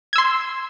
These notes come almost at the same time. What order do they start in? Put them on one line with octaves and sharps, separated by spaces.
G#6 E6 C6